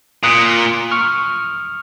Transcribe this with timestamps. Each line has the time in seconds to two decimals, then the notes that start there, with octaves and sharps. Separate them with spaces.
0.23 A#2 D#6 F#6
0.91 C#6 F6